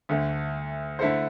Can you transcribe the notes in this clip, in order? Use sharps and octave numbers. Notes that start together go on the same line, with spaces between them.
D2 D3 A3
D3 A3 E4 A4 C5